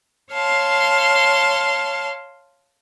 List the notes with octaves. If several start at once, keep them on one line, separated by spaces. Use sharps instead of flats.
C#5 F5 A5 C6